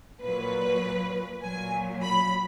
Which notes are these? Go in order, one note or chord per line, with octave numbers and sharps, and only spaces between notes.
A#2 F#3 B4
A#2 F#3 G#5
B5